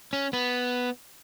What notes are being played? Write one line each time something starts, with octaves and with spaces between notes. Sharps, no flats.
C#4
B3